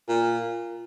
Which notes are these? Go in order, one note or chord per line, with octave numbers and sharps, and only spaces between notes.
A#2